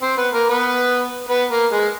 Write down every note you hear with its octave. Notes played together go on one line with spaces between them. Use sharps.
C4 C5
B3 B4
A#3 A#4
B3 B4
B3 B4
A#3 A#4
G#3 G#4